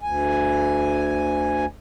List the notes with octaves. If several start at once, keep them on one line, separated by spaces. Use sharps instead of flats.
D2 G#5